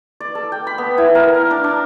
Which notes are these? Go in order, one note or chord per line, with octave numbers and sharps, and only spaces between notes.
D5
A4
G5
B5
B3
E4
A#4
F5
D4
D4